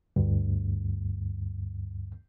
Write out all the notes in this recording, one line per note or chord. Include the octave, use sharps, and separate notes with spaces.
D2 G2